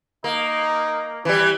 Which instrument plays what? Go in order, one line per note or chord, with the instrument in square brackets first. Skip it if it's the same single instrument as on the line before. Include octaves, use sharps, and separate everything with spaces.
[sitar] A#3 [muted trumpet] D#4
[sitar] E3 G3